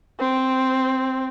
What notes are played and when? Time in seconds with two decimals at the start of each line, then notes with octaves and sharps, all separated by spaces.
0.20 C4